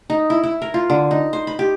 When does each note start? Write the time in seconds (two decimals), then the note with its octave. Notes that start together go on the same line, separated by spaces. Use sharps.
0.10 D#4
0.30 E4
0.44 E4
0.62 A#4
0.74 F4
0.90 D3
1.11 D#4
1.33 C5
1.47 B5
1.59 G4